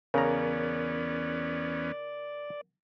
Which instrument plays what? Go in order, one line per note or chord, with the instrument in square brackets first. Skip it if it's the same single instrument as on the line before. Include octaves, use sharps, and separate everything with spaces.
[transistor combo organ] E2 B3 C#4 [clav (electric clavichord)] C#3 A#5 [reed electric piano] A#4 [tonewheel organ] D5